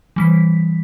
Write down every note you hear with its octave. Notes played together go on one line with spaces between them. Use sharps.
E3 G3 B6